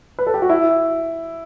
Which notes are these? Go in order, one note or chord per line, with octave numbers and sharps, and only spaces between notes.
B4
A4
G4
F#4
E4